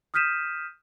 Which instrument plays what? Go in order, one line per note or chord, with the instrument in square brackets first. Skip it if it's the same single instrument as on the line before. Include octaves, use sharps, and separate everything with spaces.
[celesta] D#6 F6 G6 B6 D#7 E7